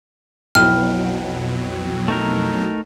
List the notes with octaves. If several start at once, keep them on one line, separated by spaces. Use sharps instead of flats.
B1 F2 B2 F#3 E4 G5 F6
A3 D#4 A#4